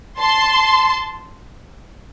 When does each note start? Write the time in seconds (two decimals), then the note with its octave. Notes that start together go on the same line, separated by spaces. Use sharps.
0.19 A5 C6